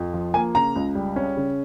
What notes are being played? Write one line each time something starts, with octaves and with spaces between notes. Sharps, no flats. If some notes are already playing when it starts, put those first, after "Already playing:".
Already playing: F2
F3
A#3 G#5
C#3 A#5
C#2
G3
C#4
C#3